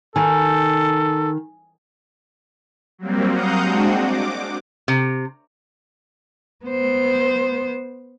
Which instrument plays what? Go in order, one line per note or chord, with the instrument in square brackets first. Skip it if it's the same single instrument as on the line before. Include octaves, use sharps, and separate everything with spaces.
[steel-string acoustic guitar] D#3 [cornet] A4 [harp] G#5
[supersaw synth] F#3 G3 A#3 C4
F5 F#5 A#5 D#6 G6
G#3 C4 D4 F#4
D6
[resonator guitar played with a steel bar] C3
[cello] B3 C5